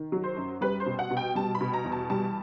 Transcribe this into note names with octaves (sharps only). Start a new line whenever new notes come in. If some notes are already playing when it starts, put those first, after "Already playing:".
Already playing: D#3
F#3
C5
F#2
G3 B4
C5
B2
F#5
B2
G5
G3 A5
B5
B2
A#5
E2
A5
G3 A5